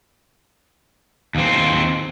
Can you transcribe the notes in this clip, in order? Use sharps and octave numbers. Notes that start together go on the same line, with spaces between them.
D#2 C4